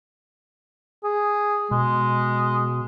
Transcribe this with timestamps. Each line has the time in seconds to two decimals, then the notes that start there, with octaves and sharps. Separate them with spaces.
1.04 G#4
1.71 B2 G#3